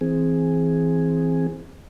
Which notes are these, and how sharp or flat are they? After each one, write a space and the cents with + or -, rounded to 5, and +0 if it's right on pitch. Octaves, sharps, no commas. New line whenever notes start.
E3 -5 C4 +0 G#4 +0